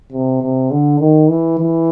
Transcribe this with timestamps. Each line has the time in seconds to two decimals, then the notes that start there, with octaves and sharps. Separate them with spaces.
0.12 C3
0.42 C3
0.71 D3
1.00 D#3
1.29 E3
1.59 E3